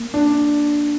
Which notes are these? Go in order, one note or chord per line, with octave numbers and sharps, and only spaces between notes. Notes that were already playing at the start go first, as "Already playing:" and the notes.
Already playing: A#3
D4